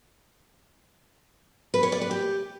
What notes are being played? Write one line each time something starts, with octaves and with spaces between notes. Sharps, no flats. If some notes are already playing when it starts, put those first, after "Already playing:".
B4
C#5
D5
B4
G4